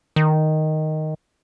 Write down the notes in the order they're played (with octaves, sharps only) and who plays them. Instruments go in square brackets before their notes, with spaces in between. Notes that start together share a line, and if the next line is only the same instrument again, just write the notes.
[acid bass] D#3